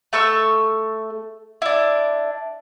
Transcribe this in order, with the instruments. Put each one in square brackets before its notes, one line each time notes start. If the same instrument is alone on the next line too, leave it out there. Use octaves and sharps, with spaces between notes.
[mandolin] A3 A4 C#6 E6
D4 E4